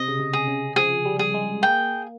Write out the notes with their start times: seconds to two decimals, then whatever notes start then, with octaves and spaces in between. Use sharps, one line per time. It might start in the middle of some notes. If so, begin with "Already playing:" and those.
Already playing: C3 D#5
0.08 C#3
0.20 C3
0.33 G#4
0.48 C#3
0.76 F3 G#4
1.05 G3
1.19 G#4
1.34 G#3
1.62 A#3 G5